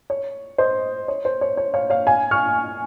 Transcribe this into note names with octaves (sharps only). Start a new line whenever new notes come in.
C#5
C5 D#5
C#5
C5
C#5
C#5
C#5 F5
C#5 F5
F5 G#5
C#6 F6